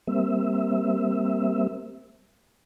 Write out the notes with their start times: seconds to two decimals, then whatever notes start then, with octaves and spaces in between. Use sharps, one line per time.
0.07 G3 A#3 C4 E5